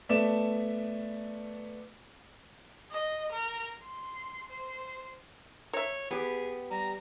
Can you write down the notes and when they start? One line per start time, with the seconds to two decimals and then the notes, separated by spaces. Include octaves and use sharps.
0.09 A3 B3 D5 E7
2.91 D#5
3.32 A#4
3.83 C6
4.49 C5
5.73 A#4 C#5 E5
6.11 B3 G4 G#4
6.70 G3 A#5